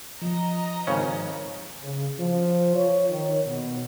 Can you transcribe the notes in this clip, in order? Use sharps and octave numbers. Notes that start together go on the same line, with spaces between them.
F3 D#5 A#5
G#1 C#3 C#4
C#3
F3
C#5
D#3
B2